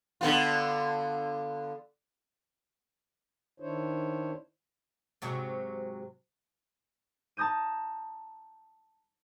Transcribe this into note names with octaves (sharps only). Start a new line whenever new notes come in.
D3 B3 F4
D#3 D4 E4 C5 C#5
G#2 C3 F#3
A5 A#5 D#6 G6 D#7